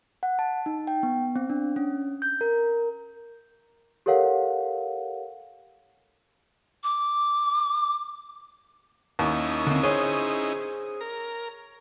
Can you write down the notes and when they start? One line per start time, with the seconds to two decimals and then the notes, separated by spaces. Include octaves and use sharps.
0.23 F#5
0.39 A5
0.66 D#4
0.87 G5
1.03 B3
1.36 C4
1.50 D4
1.76 C#4
2.22 G6
2.41 A#4
4.06 G4 A4 A#4 C#5 F5 F#5
6.83 D6
9.19 D#2 C#4 D#4 E4
9.67 D3 C4
9.83 G#4 C5 C#5
11.01 A#4